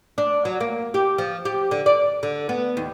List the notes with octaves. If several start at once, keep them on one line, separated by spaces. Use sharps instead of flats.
D4
F#3
A#3
G4
F3
G4
D3
D5
D3
B3
D#2